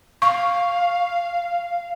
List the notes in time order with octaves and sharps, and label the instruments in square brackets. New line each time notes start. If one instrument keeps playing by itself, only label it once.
[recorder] F5 [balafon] C#6